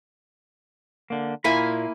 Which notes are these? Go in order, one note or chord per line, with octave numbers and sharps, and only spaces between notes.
D3 A#3
A#2 A#3 E4 F4 G#5 B5